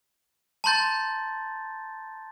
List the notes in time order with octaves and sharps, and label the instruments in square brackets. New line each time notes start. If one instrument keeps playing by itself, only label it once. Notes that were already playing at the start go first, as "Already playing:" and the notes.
[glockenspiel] A5 A#5 C6 G6 A6